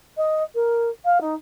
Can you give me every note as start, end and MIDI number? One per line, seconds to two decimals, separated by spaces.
0.17 0.43 75
0.55 0.90 70
1.05 1.19 77
1.21 1.34 63